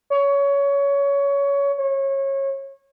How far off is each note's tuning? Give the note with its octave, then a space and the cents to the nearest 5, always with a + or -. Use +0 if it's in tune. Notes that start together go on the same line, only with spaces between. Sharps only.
C#5 +20
C#5 -25